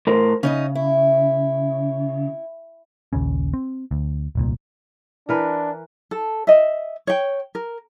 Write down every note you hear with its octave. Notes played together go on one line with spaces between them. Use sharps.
A2 A#4 C5
C#3 C#4 D#4 D#5
E4
A#1 D#2 C#3 C#4
C4
D2
D#1 C2 A#2
E3 D4 A#4 B4
A4
D#5 E5
C#5 G5
A#4